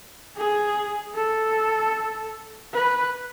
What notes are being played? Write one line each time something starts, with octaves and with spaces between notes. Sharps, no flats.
G#4
A4
B4